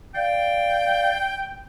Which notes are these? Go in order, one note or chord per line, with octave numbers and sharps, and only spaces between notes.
D5 F5 G5